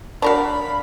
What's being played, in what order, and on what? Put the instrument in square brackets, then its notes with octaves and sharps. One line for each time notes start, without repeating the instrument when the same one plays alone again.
[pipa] D4 F5 [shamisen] F#4 A#4 C#5 [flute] B5